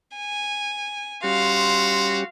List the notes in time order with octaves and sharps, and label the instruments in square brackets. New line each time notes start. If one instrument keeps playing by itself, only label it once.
[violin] G#5
[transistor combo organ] G3 C#4 G4 [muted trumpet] F#4 [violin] F5 [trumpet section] C6